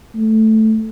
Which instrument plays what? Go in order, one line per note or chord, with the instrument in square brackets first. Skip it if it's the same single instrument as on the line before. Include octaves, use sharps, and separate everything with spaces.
[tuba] A3